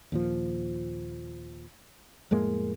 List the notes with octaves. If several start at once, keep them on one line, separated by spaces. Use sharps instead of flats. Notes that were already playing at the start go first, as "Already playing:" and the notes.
D#2 A#2 F3
F2 A2 G#3 A#3